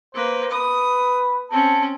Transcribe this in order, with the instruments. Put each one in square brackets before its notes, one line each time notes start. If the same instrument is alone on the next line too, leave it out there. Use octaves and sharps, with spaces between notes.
[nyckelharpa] A#3 B4 [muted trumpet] C5
[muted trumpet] B4 [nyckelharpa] D#6
[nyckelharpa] C4 C#4 [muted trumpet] A5